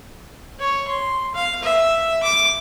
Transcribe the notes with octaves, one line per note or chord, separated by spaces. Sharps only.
C#5
C6
F5
E5
D6